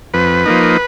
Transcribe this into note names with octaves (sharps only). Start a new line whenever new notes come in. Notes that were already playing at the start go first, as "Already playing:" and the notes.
F2 B4
F3 A#3 D#4